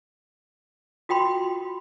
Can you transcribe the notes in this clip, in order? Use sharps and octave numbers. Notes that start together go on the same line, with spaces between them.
F4 F#4 G5 B5 C6